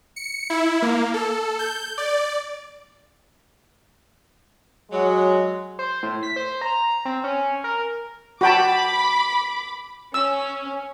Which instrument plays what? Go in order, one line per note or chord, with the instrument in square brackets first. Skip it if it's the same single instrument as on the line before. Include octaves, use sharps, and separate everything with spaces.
[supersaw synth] C#7
E4
A#3
A4
G6
D5
[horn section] F#3 [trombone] G#3
[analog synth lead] C5
A2
B6
C5
A#5
C4
C#4
A#4
[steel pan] F#4 G5 A5 [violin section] B5 D6
[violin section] C#4 [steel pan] E6